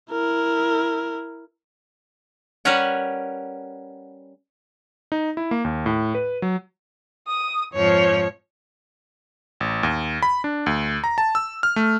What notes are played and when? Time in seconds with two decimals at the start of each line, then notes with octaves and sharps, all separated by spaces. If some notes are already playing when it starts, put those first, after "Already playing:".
0.11 E4 A#4
2.65 G3 C#4 A#4 B4 C#5 F#5
5.12 D#4
5.37 E4
5.51 A#3
5.65 D#2
5.86 A2
6.15 B4
6.42 F#3
7.27 D#6
7.74 F2 G#2 F3 C#5
9.60 A1
9.83 D#2
10.23 B5
10.44 D4
10.66 D2
11.04 A#5
11.18 A5
11.35 E6
11.63 F6
11.76 A3